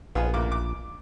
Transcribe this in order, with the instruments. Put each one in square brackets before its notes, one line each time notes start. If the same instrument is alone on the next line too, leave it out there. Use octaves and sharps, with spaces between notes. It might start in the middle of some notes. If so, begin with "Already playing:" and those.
[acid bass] A#1 [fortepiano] B3 F4 G#4
[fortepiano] A1 A#3 D6
D6